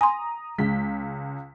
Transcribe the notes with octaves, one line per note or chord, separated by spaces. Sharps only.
G#5 A#5 C6 D#6
C#2 G#3 B6